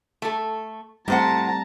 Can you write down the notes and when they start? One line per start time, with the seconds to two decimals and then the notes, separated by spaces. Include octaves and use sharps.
0.22 A3 A4
1.08 A2 G3 A3 C4 C5 F#5 A5 A#5